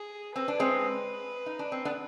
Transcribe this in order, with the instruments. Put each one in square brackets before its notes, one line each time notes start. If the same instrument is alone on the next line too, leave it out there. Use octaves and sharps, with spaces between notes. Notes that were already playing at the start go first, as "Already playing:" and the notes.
Already playing: [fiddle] G#4
[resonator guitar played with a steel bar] C4 [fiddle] B4
[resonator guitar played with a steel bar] D4
G#3 C4
D#4
D4
C4
B3 D4